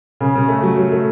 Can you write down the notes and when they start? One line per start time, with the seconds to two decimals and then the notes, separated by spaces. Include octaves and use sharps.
0.21 C#3
0.35 C#3
0.48 A3
0.63 F#3
0.77 F#3
0.92 A3